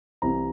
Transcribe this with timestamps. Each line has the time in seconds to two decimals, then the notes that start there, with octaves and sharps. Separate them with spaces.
0.22 C2 C3 E3 A#5